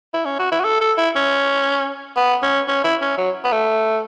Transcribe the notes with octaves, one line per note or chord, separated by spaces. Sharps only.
E4
C#4
F#4
E4
F#4
A4
A4
E4
C#4
B3
C#4
C#4
E4
C#4
F#3
B3
A3